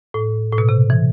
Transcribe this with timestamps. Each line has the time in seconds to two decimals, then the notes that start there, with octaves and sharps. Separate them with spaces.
0.14 A2
0.52 A2
0.58 B2
0.69 C3
0.90 E3